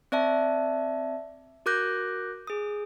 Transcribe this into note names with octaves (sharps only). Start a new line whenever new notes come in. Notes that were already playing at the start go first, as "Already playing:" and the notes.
C4 D5 E5 A5
F#4 A#4 D6 F#6 G6 A#6
G#4 D#6